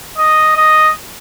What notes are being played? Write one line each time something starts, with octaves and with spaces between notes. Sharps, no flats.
D#5
D#5